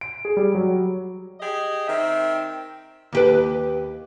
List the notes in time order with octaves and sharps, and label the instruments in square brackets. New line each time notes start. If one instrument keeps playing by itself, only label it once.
[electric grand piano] D7
G#4
G3
F#3
[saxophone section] G4 G#4 D#5
D#3 C4 E5
[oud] D#2 G4 B4